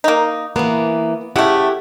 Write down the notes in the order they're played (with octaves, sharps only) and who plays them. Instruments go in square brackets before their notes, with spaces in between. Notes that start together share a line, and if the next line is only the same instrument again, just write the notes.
[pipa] A#3 D#4
[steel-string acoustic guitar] E3 A#3 [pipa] B3
[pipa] C#3 A3 [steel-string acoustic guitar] E4 G4 F#5